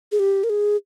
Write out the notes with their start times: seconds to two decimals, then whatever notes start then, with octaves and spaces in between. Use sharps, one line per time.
0.12 G#4
0.19 G4
0.44 A#4
0.50 G#4